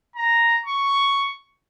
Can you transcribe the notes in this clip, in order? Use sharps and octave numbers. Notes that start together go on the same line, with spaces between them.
A#5
C#6